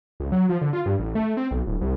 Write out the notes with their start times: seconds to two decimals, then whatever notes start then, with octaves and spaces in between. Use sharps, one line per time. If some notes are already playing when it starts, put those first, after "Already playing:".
0.20 C#2
0.32 F#3
0.49 F3
0.61 D3
0.73 F4
0.86 G2
0.99 A1
1.15 A3
1.37 C4
1.51 B1
1.67 D1
1.81 C2